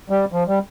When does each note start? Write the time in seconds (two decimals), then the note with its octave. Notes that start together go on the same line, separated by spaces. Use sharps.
0.10 G3
0.32 F3
0.48 G3